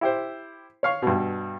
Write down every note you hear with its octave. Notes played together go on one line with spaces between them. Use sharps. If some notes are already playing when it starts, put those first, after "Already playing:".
E4 G4 C5
C#5 F5 C#6
G2 B2